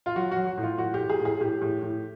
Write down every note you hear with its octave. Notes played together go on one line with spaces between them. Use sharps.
F4
F#3 F#4
F#4
F#3
F#4
A2
F4
A2 F#4
G4
A2
G#4
A2
G#4
A2 G4
A2
A2